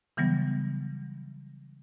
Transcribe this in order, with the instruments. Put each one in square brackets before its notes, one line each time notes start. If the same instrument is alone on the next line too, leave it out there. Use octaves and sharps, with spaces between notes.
[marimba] C#3 E3 F#3 G3 B3